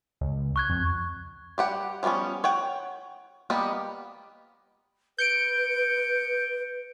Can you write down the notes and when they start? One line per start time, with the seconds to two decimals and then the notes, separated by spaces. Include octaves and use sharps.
0.21 C#2
0.56 C#6 F#6 G#6
0.69 F2
1.58 G3 G4 F#5
2.03 F3 G3 A#3 B3 C#4
2.44 C#5 F#5 G5
3.50 G3 A#3 B3 G4 D#5
5.18 B4 G6 C#7 D7